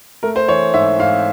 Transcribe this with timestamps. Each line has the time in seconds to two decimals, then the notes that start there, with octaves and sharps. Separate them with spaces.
0.23 A3 A#4
0.36 C5
0.49 E3 C#5
0.74 G#2 E5
0.99 G#2 F5